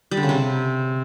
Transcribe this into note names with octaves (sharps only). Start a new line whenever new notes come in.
G3
D3
C#3
C3